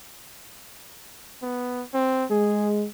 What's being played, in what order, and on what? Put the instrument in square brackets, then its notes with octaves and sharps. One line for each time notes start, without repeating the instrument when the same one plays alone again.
[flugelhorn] B3
C4
[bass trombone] G#3 [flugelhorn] G#4